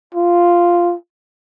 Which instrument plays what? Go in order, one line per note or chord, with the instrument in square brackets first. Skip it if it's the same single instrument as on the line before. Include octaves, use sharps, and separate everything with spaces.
[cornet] F4